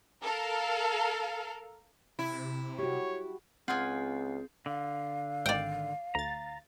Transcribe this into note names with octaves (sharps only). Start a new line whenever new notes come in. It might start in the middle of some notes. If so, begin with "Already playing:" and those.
A4 A#4 F5
C3 E4
F#4 G4 C#5
C#2 C4 F4 G#4 F#5 G#5
D3 F5
G#1 D#3 D5 G5
D2 A#5 A6